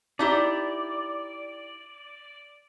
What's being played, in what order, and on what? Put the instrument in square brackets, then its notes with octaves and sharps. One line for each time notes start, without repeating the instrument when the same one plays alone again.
[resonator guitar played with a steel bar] D#4 E4 G4 [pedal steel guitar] D5